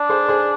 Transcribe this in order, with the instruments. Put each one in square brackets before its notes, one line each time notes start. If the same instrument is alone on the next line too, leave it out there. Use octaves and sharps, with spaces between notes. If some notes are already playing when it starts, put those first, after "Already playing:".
Already playing: [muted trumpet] D4
[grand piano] G#4 C5
G#4 C5